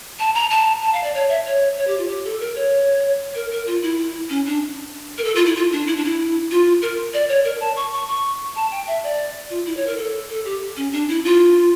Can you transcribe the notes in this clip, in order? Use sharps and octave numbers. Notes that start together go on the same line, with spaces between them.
A5
A#5
A5
A5
F5
D5
C#5
E5
C#5
C#5
G4
F4
G4
A4
A#4
C#5
A#4
A#4
F4
E4
C#4
D4
A#4
A4
F4
E4
F4
D4
E4
D4
E4
F4
A#4
D5
C#5
A#4
A5
C#6
C#6
C#6
A5
G5
E5
D5
F4
E4
C#5
A#4
A4
A4
G4
C#4
D4
E4
F4